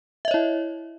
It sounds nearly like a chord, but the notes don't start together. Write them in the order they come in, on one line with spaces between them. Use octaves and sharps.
E5 D#5 C#5 E4